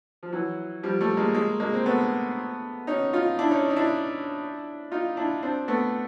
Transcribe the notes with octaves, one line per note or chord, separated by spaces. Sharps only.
F3
E3 F#3
F3 G3
G3 A3
G#3 A#3
G#3 A#3
G#3 A#3
C4
A3 B3
C#4 D#4
D#4 F4
D4 E4
C#4 D#4
D#4
D4 E4
D#4 F4
D4 E4
C4 D4
A3 B3